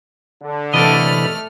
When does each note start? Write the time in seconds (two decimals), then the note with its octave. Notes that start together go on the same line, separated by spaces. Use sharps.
0.42 D3
0.74 C3 E3 A3 A4 D5 D#5 B5 F6